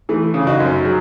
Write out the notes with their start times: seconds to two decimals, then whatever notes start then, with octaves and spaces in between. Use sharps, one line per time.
0.09 E3 A3
0.34 C#3
0.47 D#4 F#4
0.60 F#2
0.85 F#3 G#4